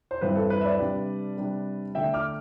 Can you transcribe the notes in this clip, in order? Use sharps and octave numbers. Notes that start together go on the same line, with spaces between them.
C5
G2 E3 G3 C4 B4
A4
B4
E5
B4 D5
C3 G3 D4
C3 G3 D4
D3 A3 D4 E5 G5
D6 F6